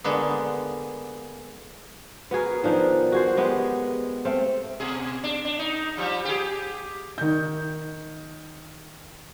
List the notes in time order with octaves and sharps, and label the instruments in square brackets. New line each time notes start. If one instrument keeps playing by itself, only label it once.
[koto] D3 G#3 A#3 B3
[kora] B3 F#4 G#4 A#4
D#3 F3 D4 D#4
F#4 G#4 C5
G#3 B3 G4
A3 C4 C5 F5
[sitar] B2 G#4
D4
D4
D#4
F3 G3
G4 G#4
[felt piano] D#3 G6